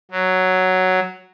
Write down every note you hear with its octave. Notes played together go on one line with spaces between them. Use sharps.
F#3